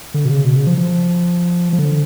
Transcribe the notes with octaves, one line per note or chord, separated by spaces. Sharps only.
D3
B2
C#3
B2
C#3
F3
F3
F3
D3